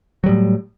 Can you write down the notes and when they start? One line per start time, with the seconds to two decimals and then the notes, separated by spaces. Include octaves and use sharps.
0.24 F#3
0.26 G3
0.29 A2